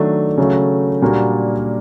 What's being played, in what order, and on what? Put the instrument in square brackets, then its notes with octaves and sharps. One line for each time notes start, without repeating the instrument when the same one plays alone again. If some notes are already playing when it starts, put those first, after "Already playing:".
Already playing: [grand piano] D#3 F#3 A3 D4
C#3 F#3 A3
A#2 G3 A#3 D4 F#4